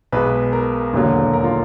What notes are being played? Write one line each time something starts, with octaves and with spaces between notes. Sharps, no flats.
B1 B2 G#3 B4
A#4
E1 D#2 D3 F#3
A#4
F4